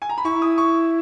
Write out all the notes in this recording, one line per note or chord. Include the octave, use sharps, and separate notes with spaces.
G#5
A#5
B5
E4 C#6
D#6
C#6